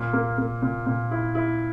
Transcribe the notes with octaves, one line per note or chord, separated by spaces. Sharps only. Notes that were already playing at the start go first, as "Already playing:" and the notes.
Already playing: A#2
A#3
A#3
A#2
A#2
E4
E4